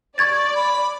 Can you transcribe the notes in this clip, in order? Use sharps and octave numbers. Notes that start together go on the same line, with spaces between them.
D5 C#6 G#6 A6
B5